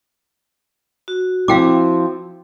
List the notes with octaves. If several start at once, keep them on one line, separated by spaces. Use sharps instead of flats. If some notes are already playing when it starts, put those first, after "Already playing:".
F#4
F3 C4 E4 F5 G5 D6